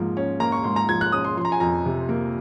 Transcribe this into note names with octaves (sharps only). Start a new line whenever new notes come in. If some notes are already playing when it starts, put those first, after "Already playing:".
Already playing: G#2 F3 A#3
C#4
A#3 A#5
C#6
G#2 C6
A#5
F3 G#6
F#6
C#4 D#6
C6
F3 C6
A#5
G#5
F2 A#5
C3
A#3